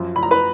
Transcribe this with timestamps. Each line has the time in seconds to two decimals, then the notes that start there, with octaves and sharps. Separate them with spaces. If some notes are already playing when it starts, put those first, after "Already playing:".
Already playing: F#2 F3
0.16 B5
0.23 A#5
0.31 B4 B5